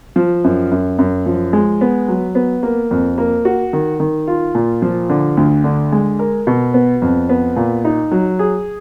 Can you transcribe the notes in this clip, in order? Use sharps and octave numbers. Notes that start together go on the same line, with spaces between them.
F3
F#2
F#2
F#2
F3
G#3
B3
F#3
B3
A#3
F2
A#3
F#4
D#3
D#3
F4
A#2
F3
D3
D2
D3
G#3
A#4
B2
B3
F2
B3
A#2
D#4
F#3
G#4